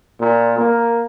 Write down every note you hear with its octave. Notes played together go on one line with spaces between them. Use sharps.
A#2
A#3